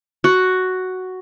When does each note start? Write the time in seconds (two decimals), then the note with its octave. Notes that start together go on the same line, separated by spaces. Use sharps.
0.24 F#4